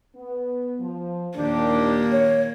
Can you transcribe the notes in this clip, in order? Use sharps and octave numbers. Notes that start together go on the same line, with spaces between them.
B3
F3
D#2 A#2 D#3 A#3 D4 G4
C#5